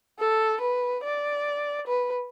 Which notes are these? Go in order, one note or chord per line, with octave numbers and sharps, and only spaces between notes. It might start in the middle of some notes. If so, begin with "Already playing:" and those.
A4
B4
D5
B4